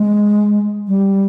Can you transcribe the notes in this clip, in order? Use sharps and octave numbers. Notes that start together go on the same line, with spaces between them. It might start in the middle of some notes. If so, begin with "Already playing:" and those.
Already playing: G#3
G3